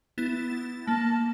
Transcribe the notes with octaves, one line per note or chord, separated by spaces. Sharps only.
B3 E4 A6
A#3 A5